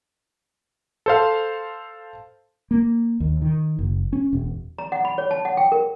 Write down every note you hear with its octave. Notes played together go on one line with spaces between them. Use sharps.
A4 C5 F5
A#3
D#2
D#3
F#1
C#4
E1
A#5
F#5
B5
C#5
A5
F#5
G5
A#4